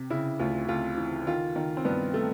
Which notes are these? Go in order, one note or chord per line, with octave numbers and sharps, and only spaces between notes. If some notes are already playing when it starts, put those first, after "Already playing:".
Already playing: C3
C#3 E4
D2 F4
D2 F4
E3
D#3 F4
D#3
C4
G2 B3
A3